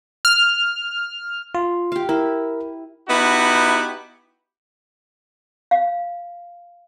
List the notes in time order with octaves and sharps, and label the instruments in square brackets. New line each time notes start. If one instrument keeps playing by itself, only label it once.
[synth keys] F6
[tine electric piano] F4
[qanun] G4 F5
[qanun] E4 [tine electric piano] A#4
[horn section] B3 D#4 E4 F#4 G4
[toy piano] F5